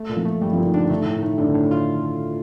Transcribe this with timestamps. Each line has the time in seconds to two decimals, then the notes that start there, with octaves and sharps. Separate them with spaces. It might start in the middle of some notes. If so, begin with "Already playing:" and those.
Already playing: A3
0.09 A#2
0.17 F3
0.25 A3
0.41 G3 A3
0.53 F3
0.58 A#2
0.65 D#3
0.74 D3 D4
0.90 D#3 A3
1.06 A2
1.14 D#3
1.23 A3
1.38 A2 D3
1.54 A2
1.71 F4